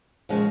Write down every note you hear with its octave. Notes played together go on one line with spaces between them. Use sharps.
A#2 C#3 F3 G#3 C#4